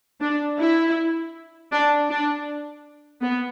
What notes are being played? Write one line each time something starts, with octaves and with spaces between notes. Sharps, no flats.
D4
E4
D4
D4
B3